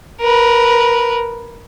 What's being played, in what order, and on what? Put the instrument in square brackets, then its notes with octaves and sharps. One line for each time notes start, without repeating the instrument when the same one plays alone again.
[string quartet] A#4 B4